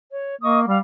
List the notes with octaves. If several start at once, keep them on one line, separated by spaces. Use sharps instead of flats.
C#5
A#3 D#5 C#6 D#6
G3 F5